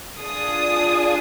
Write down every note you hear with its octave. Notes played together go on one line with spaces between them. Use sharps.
D4 F4 G#4 D#6